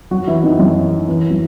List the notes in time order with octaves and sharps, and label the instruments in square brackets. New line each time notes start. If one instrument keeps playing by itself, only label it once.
[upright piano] F#3 F#4
E3 E4
D#3 D#4
F#2 F#3
E3
F#3